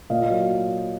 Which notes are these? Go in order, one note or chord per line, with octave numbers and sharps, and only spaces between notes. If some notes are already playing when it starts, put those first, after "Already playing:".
A#2 D#5 F5
F#3